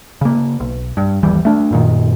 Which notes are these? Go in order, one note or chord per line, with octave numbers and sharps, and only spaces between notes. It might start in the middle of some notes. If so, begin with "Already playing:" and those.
C#3 A#3
B1
G2
G1 D#2 E3 G3
A3 D4
F#2 A#2 D#3